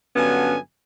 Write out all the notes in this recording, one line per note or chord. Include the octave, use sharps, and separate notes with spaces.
G2 D3 F#3 B3 C#4 G#5